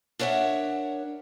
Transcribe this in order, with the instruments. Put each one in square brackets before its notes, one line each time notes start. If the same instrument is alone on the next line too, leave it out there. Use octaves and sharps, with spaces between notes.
[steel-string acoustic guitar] D4 A#4 C#5 E5 F#5